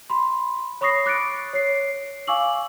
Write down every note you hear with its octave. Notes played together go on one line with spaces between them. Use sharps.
B5 C6
C#5 B5 C#6 D#6 A#6 C7
D6 F#6 A6 C#7 D7
C#5 C7
F5 G#5 C#6 D6 E6 F#7